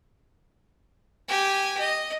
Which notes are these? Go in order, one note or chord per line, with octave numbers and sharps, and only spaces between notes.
G4 G#5
D#5